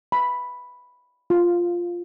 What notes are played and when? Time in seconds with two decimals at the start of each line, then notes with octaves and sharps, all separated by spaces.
0.12 B5
1.30 F4